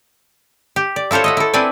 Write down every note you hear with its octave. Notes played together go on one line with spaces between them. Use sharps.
G4
D5
E4 F4 A4 C5 C#5
D#5 E5 F#5
E4 A4
C4 D4 E4 B4 D5 G#5